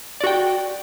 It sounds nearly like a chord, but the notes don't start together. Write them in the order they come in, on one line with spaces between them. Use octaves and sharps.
D5 F#4 G5